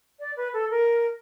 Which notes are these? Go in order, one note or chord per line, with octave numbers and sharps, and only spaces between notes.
D5
B4
A4
A#4